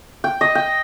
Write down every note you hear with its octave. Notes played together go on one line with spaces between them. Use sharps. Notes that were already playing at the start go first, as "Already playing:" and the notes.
G5
D#5
G5